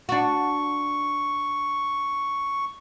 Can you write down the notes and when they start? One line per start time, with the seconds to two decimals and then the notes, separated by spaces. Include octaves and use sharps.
0.09 D4 F#4 C#6